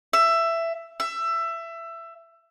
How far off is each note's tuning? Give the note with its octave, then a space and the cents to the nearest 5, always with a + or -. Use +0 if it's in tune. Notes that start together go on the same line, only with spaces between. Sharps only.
E5 +15
E5 +20